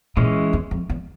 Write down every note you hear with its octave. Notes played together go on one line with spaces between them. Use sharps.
A#2 E3 G#3 C#4
E2
F2
E2